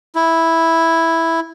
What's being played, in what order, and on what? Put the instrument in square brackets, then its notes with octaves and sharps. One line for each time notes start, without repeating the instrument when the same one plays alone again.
[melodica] E4